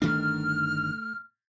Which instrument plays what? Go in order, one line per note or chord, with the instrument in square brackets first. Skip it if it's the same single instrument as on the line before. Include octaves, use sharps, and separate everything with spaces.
[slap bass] G1 D#3 D4 [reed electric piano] A3 [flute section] F6